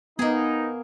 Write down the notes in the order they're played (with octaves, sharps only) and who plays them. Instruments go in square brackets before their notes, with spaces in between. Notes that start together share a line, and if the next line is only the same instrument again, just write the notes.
[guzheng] A#3 G#4 [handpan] B3 [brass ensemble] D#4